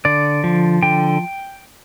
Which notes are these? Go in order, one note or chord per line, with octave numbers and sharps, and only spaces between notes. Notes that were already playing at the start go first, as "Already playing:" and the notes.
D3 D5
F3
D3 G5